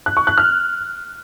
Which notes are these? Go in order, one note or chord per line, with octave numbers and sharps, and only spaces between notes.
F#6
C#6
F#6
F6